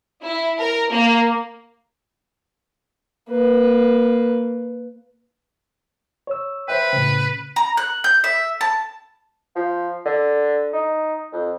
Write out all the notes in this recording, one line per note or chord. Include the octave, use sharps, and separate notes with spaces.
E4
A#4
A#3
A#3 B4
C#5 E6
B4 C5 E5 G5
A2 C#3
A#5
F#6
G6
E5
A5
F3
D3
D#4
F2